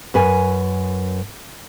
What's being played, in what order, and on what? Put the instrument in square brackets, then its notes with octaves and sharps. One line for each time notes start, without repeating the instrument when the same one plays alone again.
[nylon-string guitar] F#2 B4 G#5